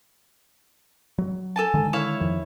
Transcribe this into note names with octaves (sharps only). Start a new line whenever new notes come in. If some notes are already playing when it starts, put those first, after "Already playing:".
F#3
A4 G#5 A5
D3 D#3 G#3
E4 C#5 F5
F2 D#3 F3